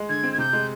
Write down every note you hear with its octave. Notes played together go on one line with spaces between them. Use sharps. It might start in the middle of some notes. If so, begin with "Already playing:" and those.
Already playing: G#3
D3 G#6
C4
G#6
C3 G6
G#3